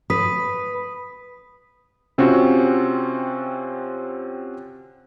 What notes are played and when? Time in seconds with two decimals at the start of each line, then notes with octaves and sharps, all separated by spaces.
0.10 B4 B5 D#6 B6
2.18 C3 C4 C#4 F4 F#4